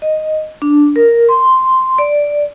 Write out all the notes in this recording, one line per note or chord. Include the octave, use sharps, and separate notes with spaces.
D#5
D4
A#4
C6
D5